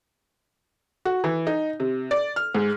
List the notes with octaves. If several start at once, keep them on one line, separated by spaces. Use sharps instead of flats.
F#4
E3
D#4
C3
D5
F6
G#2